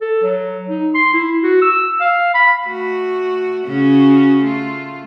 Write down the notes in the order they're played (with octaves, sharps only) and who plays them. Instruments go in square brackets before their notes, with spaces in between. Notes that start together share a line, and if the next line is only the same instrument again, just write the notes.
[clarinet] A4
F#3
D#4
C6
E4
F#4
E6
F5
B5
[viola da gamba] A3 F#4
C#3 C#4 F#4
A3 F4